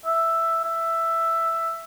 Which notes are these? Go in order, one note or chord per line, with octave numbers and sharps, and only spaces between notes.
E5
E5